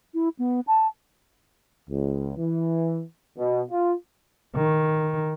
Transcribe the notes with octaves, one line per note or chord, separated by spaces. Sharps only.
E4
B3
A5
C#2
E3
B2
F4
D#3